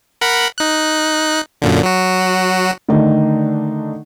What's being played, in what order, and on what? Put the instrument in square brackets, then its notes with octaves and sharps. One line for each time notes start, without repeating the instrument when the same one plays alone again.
[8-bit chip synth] A#4 F#5 B5
D#4 F#6
F#2 A#2 D3
F#3 F#4
[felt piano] D3 D#3 A3 D4 D#4